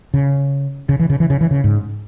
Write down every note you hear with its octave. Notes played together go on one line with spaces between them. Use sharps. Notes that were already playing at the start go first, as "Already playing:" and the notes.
C#3
C#3
E3
C#3
E3
C#3
E3
C#3
G#2